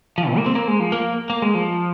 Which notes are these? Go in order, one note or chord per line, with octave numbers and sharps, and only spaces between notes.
F3
A#2
A#3
C4
A#3
G#3
F3
A#3
A#3
G#3
F3